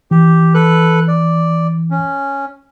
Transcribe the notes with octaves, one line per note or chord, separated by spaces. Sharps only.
E3 G4
A4 B4 F#6
D5
C#4